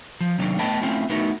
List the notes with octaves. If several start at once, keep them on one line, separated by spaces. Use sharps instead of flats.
F3
C3 D#3 F#3 A#3 D4
A3 B3 D#5 G5 A5 B5
A3 C4 C#4 E4 F4
A3 B3 D#4 E4 F#4 A#4